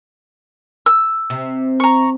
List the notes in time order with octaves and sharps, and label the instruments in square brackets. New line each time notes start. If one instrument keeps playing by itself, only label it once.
[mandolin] E6
[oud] C3
[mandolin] A#5 C#6